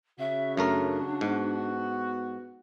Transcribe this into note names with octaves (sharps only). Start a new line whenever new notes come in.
C#3 F#4 E5
F#2 A3 D4 A#4
G#2 B3 F#4